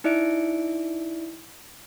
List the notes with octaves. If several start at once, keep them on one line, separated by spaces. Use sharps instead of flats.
D#4 E4 D5 E5 C#7 D7